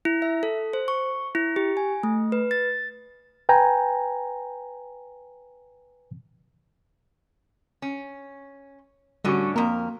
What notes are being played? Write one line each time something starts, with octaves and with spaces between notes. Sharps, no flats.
E4
E5
A4
C5
C#6
E4
G4
G#5
A3
B4
A6
B4 G5 G#5 A#5
C#4
A2 D3 G3 C#4 F#4 C#6
F2 A#3 A#4